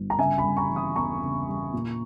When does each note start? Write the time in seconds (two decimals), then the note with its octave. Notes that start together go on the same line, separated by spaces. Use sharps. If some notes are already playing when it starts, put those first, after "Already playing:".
Already playing: G1
0.10 A#5
0.18 C#3 E5 G#5
0.38 G#5 B5
0.44 G3
0.57 A#5 C#6
0.70 E3
0.76 B5 D#6
0.96 E2 A#5 C#6
1.21 C#3
1.47 G3
1.73 A#2